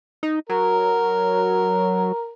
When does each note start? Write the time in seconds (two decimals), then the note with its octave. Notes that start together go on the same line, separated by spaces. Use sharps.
0.23 D#4
0.49 F#3 A#4